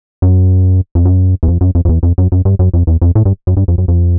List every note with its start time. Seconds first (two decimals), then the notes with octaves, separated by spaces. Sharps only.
0.22 F#2
0.95 F2
1.06 F#2
1.43 E2
1.48 F2
1.61 F#2
1.75 F2
1.85 F2
1.89 E2
2.03 F2
2.18 F#2
2.32 F#2
2.45 G2
2.59 F#2
2.74 F2
2.87 E2
3.02 F2
3.15 A2
3.25 G2
3.47 F#2
3.57 G2
3.68 F2
3.78 F#2
3.88 F2